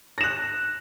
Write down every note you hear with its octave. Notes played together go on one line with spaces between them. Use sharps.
F#6 A#6 E7